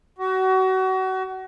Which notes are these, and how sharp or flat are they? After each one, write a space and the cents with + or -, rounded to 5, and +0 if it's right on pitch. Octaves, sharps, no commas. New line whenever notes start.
F#4 +30